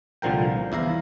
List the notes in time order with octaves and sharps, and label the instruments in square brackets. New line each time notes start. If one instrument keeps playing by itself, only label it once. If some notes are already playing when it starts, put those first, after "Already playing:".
[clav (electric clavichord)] C2 A#2 D3 F3 A#4 G5
E2 E4 F5 A#5